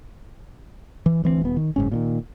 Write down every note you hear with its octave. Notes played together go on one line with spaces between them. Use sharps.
E3
D2 E3 A#3 C4
D#1 B3
D#3
F#1 G#2 C#4
A#2 D3 D#3